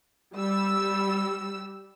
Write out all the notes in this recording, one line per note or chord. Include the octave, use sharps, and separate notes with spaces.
G3 E6